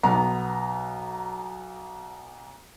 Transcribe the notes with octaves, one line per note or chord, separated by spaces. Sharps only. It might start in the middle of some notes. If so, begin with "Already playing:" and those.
B1 B3 A#5